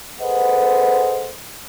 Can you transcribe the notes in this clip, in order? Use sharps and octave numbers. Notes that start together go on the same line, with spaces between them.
G#4 A4 B4 C5 D#5 F#5